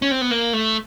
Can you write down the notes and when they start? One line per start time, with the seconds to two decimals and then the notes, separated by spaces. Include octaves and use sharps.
0.02 C#4
0.11 C4
0.21 B3
0.31 A#3
0.53 A3